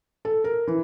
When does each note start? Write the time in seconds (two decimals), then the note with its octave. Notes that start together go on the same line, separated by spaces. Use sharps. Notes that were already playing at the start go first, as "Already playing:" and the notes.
0.25 A4
0.44 A#4
0.67 E3